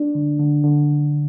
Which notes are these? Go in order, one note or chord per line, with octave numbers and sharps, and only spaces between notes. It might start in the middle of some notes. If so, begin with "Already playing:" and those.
Already playing: D4
D3
D3
D3